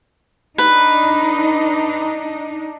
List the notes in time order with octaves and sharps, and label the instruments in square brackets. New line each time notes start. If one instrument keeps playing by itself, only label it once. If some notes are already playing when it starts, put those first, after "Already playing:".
[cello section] D4 D#4 [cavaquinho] B4